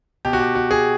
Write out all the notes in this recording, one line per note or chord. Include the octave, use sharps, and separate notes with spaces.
B2 G4
F#4
G4
F#4
G#4